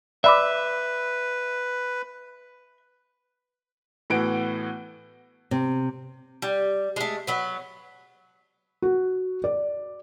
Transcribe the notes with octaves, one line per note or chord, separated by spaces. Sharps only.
B4 D5 E5 B5 D6
A2 E3 B3 F#4 F#5 D7
C3
G3
G#3 A3
F#3 B3
F#4
D5